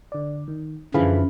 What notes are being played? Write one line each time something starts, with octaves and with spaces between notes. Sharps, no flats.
D3 D5
D#3
F#2 D3 E3 F3 G#4 F5 B5